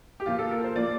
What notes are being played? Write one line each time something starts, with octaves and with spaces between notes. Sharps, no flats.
G4
A#2 F3 A#3 F4
A4
A#4
C5
A#2 F3 A#3 D5